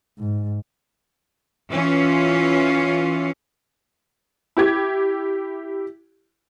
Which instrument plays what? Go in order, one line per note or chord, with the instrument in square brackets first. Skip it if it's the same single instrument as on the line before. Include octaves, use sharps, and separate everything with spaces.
[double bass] G#2
[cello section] E3 C#4 F4
[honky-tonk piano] E4 G4 G#6